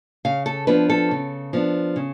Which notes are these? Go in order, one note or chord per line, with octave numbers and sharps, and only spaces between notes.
C#3 F5
A4
F3 B3 D4 B4
A4
C#3
F3 B3 D4
C#3